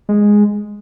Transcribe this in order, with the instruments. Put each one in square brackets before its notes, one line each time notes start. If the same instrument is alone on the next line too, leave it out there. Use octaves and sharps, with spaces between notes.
[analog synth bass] G#3